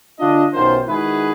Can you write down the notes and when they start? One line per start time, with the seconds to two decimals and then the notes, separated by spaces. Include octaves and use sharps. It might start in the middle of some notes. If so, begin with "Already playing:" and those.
0.18 D3 D4 F4 D#5
0.53 B1 F#2 D#3 F4 C5
0.86 D#3 G#3 E4 F#4 G#4 B4